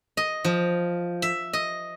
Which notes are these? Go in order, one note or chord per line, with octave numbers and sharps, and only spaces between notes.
D#5
F3
E5
D#5